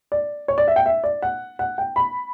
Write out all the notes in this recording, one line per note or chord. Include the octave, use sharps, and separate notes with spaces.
D5
C#5
D5
E5
G5
E5
D5
F#5
F#5
G5
B5